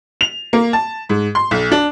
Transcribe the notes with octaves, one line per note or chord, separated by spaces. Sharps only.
F7
A#3
A5
G#2
C6
B1
D4